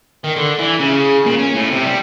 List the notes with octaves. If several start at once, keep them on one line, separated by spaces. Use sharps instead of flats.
D#3
D3
E3
C#3
A#2
C#4
A2
C3
G3